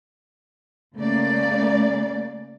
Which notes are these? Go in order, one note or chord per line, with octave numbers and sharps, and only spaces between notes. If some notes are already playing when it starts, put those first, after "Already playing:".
C#3 A3 A#3 D5